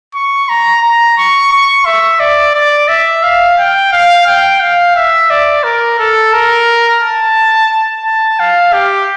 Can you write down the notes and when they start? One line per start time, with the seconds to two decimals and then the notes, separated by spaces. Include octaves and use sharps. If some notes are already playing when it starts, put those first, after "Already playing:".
0.15 C#6
0.49 A#5
0.82 A#5
1.17 C#6
1.52 C#6
1.85 E5
2.20 D5
2.55 D5
2.88 E5
3.23 F5
3.58 G5
3.92 F5
4.27 G5
4.61 F5
4.96 E5
5.30 D5
5.64 A#4
5.99 A4
6.33 A#4
7.02 A5
8.05 A5
8.40 F5
8.73 G4